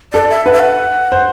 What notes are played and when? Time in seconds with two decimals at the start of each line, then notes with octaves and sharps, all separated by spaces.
0.13 A4 D5
0.30 E5
0.46 B4 F#5
0.52 E5
0.59 F#5
1.12 C5